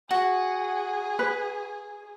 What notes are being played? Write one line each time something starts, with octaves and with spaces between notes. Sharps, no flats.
F#4 G#4 F#5
B4